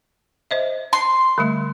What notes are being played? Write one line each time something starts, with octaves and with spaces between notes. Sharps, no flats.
C5 D#5 E5
C6
D3 G3 A3